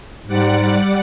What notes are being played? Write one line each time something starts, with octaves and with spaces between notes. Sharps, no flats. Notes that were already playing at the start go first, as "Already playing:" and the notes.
G#2 G3 D5 F#5